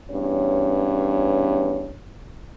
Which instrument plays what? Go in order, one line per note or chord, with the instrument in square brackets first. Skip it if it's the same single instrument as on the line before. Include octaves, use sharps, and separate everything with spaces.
[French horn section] E2 G2 C#4 C#5